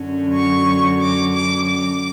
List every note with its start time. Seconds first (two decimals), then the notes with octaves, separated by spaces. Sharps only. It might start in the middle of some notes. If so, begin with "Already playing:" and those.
Already playing: F#2 D3 F#3 C#4
0.32 C#6
1.00 D6
1.33 D6
1.66 D6